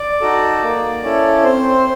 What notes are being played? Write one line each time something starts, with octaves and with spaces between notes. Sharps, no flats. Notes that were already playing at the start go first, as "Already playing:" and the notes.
Already playing: D5
D#4 F#4 A4
A#3
C#4 E4 A4
C4 C5